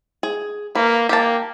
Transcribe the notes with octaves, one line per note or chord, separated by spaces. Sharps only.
G#4
A#3 B4
A#3 G4 A5